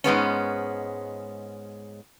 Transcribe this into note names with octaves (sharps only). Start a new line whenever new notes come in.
G#2 G#3 B3 C#4